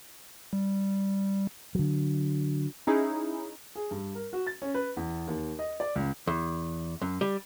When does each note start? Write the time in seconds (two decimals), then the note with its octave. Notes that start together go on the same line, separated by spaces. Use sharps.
0.53 G3
1.75 D3 F#3
2.87 C#4 D#4 E4 G#4
3.75 G#4
3.91 G2
4.15 A#4
4.33 F#4
4.47 A6
4.62 C#4
4.74 B4
4.97 E2
5.27 D#2
5.59 D#5
5.80 D5
5.95 C#2
6.27 E2
7.02 F#2
7.21 G3